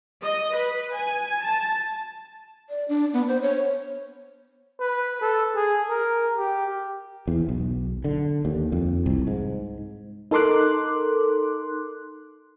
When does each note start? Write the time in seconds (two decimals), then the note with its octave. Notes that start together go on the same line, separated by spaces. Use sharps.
0.22 D#5
0.55 B4
0.95 G#5
1.44 A5
2.69 D5
2.89 D4
3.13 B3
3.28 C5
3.42 C#5
4.80 B4
5.21 A4
5.56 G#4
5.89 A#4
6.37 G4
7.28 E2
7.49 B1
8.04 D3
8.45 D#2
8.72 F2
9.06 C2
9.27 G#2
10.31 D#4 A4 A#4 C6 D6 F#6